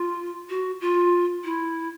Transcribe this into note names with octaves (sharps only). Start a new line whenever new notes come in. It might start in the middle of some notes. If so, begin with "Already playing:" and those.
Already playing: F4
F#4
F4
E4